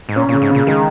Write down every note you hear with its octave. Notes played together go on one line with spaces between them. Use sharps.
G#2
A#2 C#4
A#2 C#3
G#2
A#2 C#3
D#3 G#3